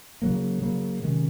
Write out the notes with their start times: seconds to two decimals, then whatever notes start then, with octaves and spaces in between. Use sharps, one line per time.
0.22 C#3 F#3 A#3
0.62 C#3 F#3 A#3
1.02 C3 D#3 G#3 C#4